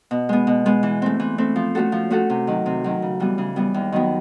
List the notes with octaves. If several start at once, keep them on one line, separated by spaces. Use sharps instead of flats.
B2
G#3 B3
B2
G#3 B3
E3
A3 C4
E3
A3 C4
F3
A3 C#4 F#4 A4
F3
A3 C#4 F#4 A4
C3
D#3 F#3
C3
D#3 F#3
C#3
E3 G3 B3
C#3
E3 G3 B3
D#2
D#3 F#3 B3